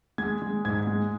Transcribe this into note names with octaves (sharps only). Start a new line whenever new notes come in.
G#3 G#6
G#3
G#2 G#6
G#3